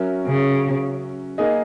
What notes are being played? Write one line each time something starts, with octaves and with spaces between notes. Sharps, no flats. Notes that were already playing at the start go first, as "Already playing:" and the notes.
Already playing: F#3 C#4 F#4 A#4 E5
C#3
A#3 D#4 G#4 D#5